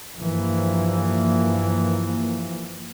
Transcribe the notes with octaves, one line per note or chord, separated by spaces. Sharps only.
G2 E3 F3 A#3